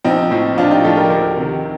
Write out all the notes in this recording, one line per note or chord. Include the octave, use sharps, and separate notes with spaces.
A#1 C4 D#4
A2 F3
A#1 D4 F4
D#4 G4
A2 F3 F4 A4
G4 A#4
D2 G4 A#4
C3 D#3